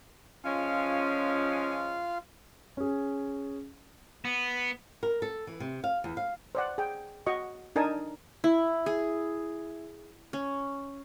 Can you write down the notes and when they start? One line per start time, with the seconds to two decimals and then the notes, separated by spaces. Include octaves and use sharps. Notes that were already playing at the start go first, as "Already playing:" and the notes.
0.45 F3 G#3 C#4 F4 F5
2.77 C#4 G#4
4.25 B3
5.03 A#4
5.22 A4
5.47 E3
5.60 C3
5.84 F5
6.04 E2
6.17 F5
6.55 C5 D5 F#5
6.78 G#4 G5
7.26 F#4 D#5 C#6
7.76 D4 D#4 A#4 G#5 A5 D#6
8.44 E4
8.86 G#4
10.33 C#4